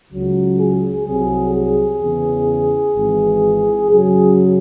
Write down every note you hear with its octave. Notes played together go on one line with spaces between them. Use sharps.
C#2 C#3 F#3
G#4
C2 C3 F#3 G#4
G#4
E2 C#3 E3
G#1 G#2 E3
F#2 C#3 F#3 G#4